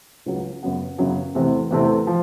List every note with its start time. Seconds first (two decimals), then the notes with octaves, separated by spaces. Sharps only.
0.26 C#2 C#3 F#3
0.63 F#2 C#3 F#3 B3
0.98 F#2 C#3 F#3 B3
1.35 E2 C3 E3 A3 C4
1.71 E2 C3 E3 A3 C4
2.07 F3